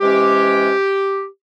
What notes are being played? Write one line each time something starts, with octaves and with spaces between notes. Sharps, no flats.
C3 E3 G#3 C#4 G4